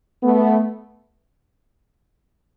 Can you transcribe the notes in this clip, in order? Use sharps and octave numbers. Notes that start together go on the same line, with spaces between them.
A3 B3